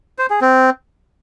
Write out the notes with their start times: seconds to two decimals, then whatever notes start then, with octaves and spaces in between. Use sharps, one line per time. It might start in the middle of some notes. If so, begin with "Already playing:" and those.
0.19 C5
0.30 G#4
0.41 C4